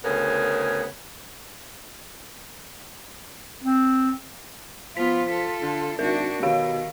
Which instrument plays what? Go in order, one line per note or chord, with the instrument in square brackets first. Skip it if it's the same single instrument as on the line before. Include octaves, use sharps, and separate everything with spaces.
[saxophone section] D2 C#3 B3 G#4 A#4
[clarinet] C4
[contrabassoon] F3 [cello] B3 F4 [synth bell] B6
[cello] F4 A4
[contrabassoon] D3
[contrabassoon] G#1 [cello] D4 F#4 [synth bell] A#4
[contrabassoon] B2 [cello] D#3 [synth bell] G4 F5